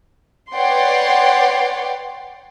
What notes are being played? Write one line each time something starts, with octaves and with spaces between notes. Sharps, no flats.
B4 C#5 D5 F#5 G5 C6